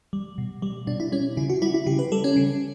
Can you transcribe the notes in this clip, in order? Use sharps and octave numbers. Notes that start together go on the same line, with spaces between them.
G3
B2
G3
B2 D4
E4
G3 C#4
C#3 E4
F#4
G3 E4
E4
C#3 G4
B4
G3 A4
C#4
C#3